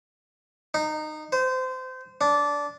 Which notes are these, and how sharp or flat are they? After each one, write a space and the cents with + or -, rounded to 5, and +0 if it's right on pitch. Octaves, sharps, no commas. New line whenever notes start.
D#4 -20
C5 -25
D4 -15